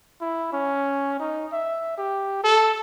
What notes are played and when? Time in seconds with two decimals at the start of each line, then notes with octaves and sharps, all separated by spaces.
0.21 E4
0.52 C#4
1.19 D#4
1.52 E5
1.98 G4
2.44 A4